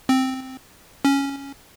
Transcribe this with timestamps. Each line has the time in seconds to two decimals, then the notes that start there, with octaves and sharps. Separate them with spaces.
0.09 C4
1.05 C#4